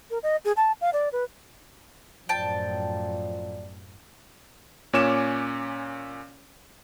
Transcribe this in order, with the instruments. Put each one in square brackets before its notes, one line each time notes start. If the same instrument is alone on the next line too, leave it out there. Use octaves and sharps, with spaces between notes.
[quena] A#4
D#5
G#4
A5
F5
D5
B4
[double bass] F#2 A2 [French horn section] F3 D5 [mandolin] G5 A5
[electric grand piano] A#2 C#4 C#5 G#5 D6 E7